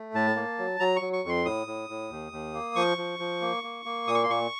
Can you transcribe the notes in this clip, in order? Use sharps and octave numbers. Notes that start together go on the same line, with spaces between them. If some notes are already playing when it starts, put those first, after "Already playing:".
Already playing: A3
A2 A5
A#3
F#3
F#3 A#5
C#6
F#3
C#6
F2 C6
A2 D#6
A2
A2
D#2
D#2
A#3
F3 C#6
F3
F3
A#3
A#3
A#3
A#2 D#6
C#6
C6
A#2 C#6